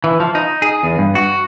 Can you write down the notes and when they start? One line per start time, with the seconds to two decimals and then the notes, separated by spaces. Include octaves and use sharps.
0.04 E3
0.20 F3
0.35 D#4
0.62 G#4
0.83 E2
0.98 G2
1.15 F#4